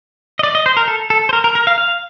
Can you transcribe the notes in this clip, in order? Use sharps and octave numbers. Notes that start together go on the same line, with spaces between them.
D#5
D5
D#5
C5
A#4
A4
A4
C5
A#4
A#4
A#4
F5
F5